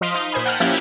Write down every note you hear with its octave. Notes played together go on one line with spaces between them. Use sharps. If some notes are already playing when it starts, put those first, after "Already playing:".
F3 D#5 F5 C6 B6 D7
D#4
A#2 C5 G#5 B5
F#5 G5 A5 A#5 F6 F#6
F3 A#3 C#4 E4 G4